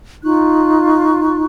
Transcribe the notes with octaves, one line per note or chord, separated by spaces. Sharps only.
D#4 F4 C#6 F#6